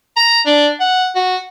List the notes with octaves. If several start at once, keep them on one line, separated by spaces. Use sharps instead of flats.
A#5
D4
F#5
F#4